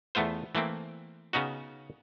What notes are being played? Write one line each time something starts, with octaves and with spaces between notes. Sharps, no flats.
E2 A3 B3 F4 C5
E3 A3 A#3 C4
C#3 B3 C#4 D#4 F#4